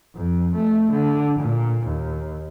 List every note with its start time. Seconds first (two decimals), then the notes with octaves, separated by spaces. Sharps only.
0.15 F2
0.55 A3
0.92 D3
1.40 A#2
1.87 D#2